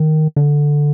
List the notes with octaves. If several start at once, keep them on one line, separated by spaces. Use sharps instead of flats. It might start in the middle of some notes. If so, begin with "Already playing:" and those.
Already playing: D#3
D3